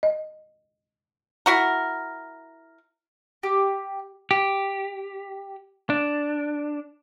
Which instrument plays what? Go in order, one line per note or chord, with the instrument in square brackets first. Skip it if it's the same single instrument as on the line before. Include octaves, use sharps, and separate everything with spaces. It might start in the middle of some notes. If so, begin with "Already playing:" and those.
[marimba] D#5
[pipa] E4 F#4 A#4
[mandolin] G4
[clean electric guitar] G4
D4